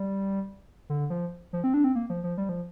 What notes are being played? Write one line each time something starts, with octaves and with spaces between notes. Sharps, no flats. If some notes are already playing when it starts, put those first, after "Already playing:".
Already playing: G3
D3
F3
F3
C4
D4
C4
A#3
F3
F3
G3
F3